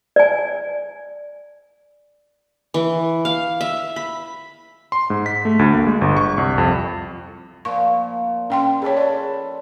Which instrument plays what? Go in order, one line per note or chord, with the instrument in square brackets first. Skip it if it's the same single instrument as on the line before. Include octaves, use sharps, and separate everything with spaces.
[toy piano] D5 G#5
[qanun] E3
F5
E5
B5
[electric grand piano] C6
G#2
B6
A3
D2
A#3
G#3
G1
C#6
C2
F2
[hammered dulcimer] A#2 F3 [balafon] C#6
[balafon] C#4 G5 C6
[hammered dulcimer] C#4 A4 B4 [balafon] G#4 C#5
[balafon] D5